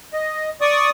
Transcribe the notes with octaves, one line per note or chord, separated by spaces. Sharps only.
D#5
D5 C#6 D#6